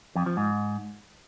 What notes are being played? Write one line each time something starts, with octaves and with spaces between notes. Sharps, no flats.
F2
F3
G#2